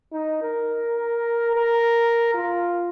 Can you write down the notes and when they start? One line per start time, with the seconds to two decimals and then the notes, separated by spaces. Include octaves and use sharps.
0.13 D#4
0.43 A#4
1.56 A#4
2.34 F4